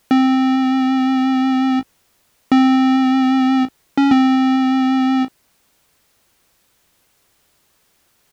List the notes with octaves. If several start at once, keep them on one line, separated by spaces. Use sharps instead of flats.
C4
C4
C#4
C4